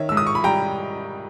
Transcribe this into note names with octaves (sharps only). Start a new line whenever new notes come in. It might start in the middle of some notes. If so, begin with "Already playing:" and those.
Already playing: D#3 C#5 E5
G#2 E6
D#6
C#6
B5
G3 G5 A#5